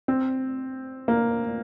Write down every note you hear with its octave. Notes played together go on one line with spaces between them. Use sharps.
C4
A#3